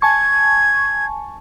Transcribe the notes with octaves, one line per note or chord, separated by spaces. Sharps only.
G#5 A5 C#6 G#6